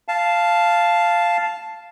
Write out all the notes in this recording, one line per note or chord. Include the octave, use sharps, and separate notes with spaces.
F5 A5